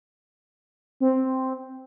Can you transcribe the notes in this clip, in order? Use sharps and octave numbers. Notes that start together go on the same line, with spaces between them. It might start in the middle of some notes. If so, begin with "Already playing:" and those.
C4